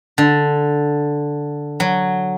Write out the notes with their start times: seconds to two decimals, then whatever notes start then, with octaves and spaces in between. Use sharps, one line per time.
0.18 D3
1.80 F#3